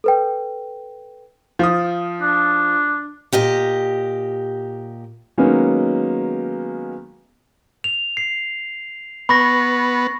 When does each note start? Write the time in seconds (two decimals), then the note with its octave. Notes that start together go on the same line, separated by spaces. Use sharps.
0.04 A4 B4 G5
1.59 F3 D#6
2.21 D4
3.33 A#2 G4 D#5
5.38 D#3 F#3 G#3 A#3 B3 C#4
7.84 F7
8.17 C7
9.29 B3 B5 C#6 A#6